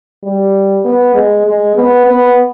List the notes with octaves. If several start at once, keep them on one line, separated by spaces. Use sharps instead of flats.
G3
B3
G#3
G#3
B3
B3